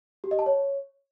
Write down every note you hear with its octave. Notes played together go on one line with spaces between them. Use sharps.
G4
D#5
A5
C#5